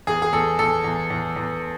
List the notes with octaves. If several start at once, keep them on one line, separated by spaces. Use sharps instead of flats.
E2 G#4
G#4
E2 A4
E2 A4
E2
E2
E2